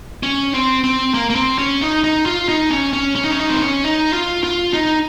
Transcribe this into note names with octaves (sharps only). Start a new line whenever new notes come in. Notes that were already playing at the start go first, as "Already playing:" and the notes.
C#4
C4
C4
A#3
A#3
C4
C#4
D#4
D#4
F4
D#4
C#4
C#4
C#4
D#4
C#4
D#4
C4
C#4
D#4
F4
F4
D#4